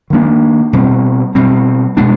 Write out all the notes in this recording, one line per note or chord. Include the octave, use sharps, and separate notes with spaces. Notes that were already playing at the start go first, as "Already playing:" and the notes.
D#3 G3 A#3 D4
B2 G3 C4
B2 G3 C4
B2 G#3 B3 D4